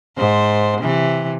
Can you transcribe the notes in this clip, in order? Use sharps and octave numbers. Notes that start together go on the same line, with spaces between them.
G#2 C5
C3 E3